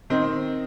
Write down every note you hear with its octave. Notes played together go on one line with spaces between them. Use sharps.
D#3 C4 D#4